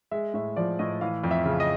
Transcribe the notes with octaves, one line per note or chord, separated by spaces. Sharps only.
G#3 E5
A2 E5
F3 D5
A2 D#5
E3 F5
F2
E5
C#3
D#5